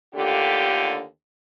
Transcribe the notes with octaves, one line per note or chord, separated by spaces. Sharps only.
D#2 D3 A3 F4 G4